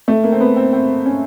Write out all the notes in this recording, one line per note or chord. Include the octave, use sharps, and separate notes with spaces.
A3
A#3
C4
B3
C4
C4
C#4